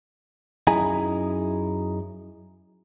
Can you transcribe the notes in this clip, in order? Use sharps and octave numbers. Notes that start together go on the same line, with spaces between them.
F#2 D#4 E4 G#4 G#5 A#5